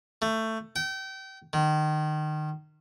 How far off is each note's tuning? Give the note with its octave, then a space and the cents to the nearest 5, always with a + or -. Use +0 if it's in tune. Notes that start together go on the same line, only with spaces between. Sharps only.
A3 +15
G5 -30
D#3 -25